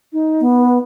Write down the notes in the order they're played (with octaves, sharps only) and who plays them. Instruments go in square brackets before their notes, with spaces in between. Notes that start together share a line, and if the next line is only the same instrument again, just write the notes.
[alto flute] D#4
[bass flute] B3
[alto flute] B4